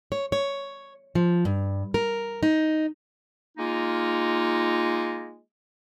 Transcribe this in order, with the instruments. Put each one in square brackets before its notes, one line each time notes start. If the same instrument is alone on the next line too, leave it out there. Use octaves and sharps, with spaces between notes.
[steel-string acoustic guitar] C#5
C#5
F3
G2
A#4
D#4
[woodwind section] G#3 A#3 D#4 F4